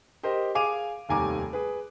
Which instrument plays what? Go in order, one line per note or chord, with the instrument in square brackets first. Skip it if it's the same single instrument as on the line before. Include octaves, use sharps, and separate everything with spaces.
[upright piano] G4 A#4 C5 D#5
G#4 F5 G#5 D6 D#7 F7
F1 D#2 G3 G#5 A#5 D6
G#4 B4